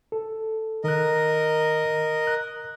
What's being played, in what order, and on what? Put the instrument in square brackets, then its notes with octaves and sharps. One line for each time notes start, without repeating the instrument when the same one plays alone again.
[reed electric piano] A4
[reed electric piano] D#3 F#6 [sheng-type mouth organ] A#4 D#5
[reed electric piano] F#6